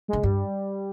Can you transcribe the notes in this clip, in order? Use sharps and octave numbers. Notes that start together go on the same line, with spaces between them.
D3 G#3
G2 G3